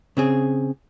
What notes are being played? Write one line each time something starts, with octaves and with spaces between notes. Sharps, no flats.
C#3 C4 G#4